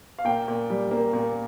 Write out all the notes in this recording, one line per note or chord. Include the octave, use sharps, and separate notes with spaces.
F5
A#2 G5
A#2
G3
A#3
A#2